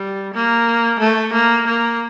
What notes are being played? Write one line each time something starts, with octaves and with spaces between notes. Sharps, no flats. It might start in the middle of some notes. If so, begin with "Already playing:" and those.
Already playing: G3
A#3
A3
A#3
A#3